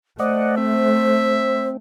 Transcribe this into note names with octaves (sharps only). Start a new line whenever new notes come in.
A3 C5 D5 D#5 F#5
C4 E5